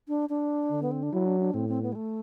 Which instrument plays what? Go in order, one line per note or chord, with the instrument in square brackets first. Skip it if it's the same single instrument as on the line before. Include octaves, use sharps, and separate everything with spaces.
[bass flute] D4
D4
[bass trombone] D3
[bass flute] B3
C4
D4
[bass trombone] F#3 [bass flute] E4
[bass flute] D4
D4
[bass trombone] A2 [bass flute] C4
[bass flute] C4
B3
G3
A3